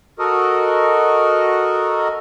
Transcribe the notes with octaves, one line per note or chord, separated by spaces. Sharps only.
F#4 A4 A#4 D#5